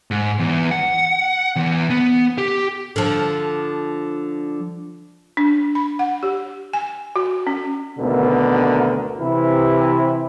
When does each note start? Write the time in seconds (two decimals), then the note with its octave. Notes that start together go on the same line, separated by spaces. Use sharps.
0.11 G#2
0.39 E2
0.71 F#5
1.56 E2
1.90 B3
2.38 G4
2.96 D3 F3
5.37 D4
5.75 B5
5.99 F#5
6.23 G4
6.73 G#5
7.16 F#4
7.47 C#4
7.99 G#1 D2 B2 D3 B3 A#4
9.19 C3 E3 E4